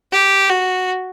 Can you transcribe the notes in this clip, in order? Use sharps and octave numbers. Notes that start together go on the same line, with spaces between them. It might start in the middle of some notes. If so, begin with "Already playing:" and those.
G4
F#4